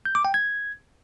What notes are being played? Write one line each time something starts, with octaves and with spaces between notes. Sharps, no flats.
G6
D6
G5
G#6